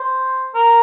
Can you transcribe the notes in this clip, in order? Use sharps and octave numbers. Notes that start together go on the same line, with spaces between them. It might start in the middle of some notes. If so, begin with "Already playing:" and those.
Already playing: C5
A#4